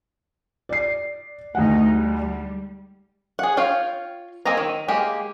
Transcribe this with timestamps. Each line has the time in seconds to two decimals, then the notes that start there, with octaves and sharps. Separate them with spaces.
0.69 D5 C7
1.55 D2 D#3 A3 D#4 F#5
1.87 G3 G#3
3.39 G#4 F#5
3.57 F4 C#5 F5 G5
4.45 A#3 C4 D#5 G#5 A#5
4.57 D#3
4.88 G#3 A#3 G4